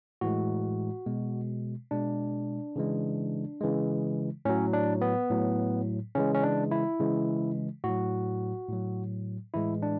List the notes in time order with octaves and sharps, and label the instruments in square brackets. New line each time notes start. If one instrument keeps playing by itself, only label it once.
[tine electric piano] A2 E3 G#3 F#4
B2 G#3
B2 G#3 D4
C#3 E3 G#3
C#3 E3 G#3
A2 F#3 C#4
D4
B3
A2 F#3
C#3 E3 G#3 C#4
C#4
D4
E4
C#3 E3 G#3
A2 F#4
F#3
A2 F#3
A2 E3 G#3 E4
D4